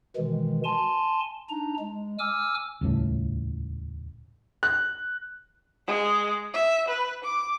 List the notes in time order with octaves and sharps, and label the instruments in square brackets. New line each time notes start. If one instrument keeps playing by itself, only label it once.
[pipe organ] B2 D#3 E3 G#3
G#5 A5 C6
D4 D#4 A#5
G#3
G#5 D6 E6 F6
[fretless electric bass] D#1 C#2 A2
[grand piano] F#6
[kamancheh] G#3
E5
B4
D6